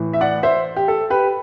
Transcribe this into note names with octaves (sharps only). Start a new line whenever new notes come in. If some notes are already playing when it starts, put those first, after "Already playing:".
Already playing: A2 E3
E5
D5 F#5
C5 E5
G4
A4
G4 B4